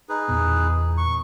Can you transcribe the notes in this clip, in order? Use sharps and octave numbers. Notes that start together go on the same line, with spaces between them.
D#4 G#4 B4
E2 A#2 B3
C#6